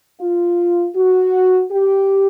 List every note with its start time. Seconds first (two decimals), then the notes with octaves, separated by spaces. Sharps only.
0.20 F4
0.96 F#4
1.71 G4